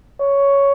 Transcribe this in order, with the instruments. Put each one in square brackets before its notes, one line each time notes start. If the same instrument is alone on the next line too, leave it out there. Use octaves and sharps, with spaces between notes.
[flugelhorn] C#5